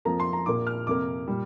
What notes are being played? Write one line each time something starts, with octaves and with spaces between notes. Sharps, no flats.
F2 F3 A#3 A#5
C6
A#5
A#1 A#2 A#3 D6
F6
F2 C3 A#3 D6
A#2 G3